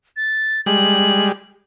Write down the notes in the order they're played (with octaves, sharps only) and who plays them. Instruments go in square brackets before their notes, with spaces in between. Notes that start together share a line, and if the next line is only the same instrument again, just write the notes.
[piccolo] A6
[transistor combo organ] G3 G#3 [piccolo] F#7